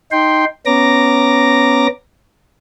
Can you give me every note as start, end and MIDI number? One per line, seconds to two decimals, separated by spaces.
0.12 0.45 63
0.12 0.45 79
0.12 0.45 84
0.66 1.87 59
0.66 1.87 61
0.66 1.87 82
0.66 1.87 86
0.66 1.87 94